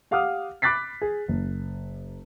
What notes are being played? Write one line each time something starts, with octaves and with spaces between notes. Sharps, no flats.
G4 F5 F#5 D6 D#6 F6
B5 D6 F#6 A6 B6 C7
G#4
F#1